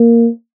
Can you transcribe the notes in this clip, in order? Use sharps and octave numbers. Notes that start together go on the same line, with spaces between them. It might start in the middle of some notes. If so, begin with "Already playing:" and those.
Already playing: A#3